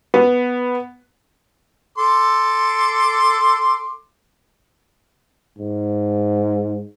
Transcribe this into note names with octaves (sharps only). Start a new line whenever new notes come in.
B3
A4 C6 D6
G#2